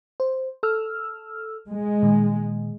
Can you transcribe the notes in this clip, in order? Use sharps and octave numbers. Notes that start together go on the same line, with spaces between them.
C5
A4 E6 F6
G#3
A#2 D#3